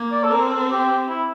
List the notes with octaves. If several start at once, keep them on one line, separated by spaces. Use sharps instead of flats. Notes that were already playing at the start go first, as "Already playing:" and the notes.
Already playing: A#3
D5
A4
C4 A#4
A4
G4
E4